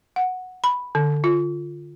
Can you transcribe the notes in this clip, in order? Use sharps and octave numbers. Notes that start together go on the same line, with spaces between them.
F#5
B5
D3
F4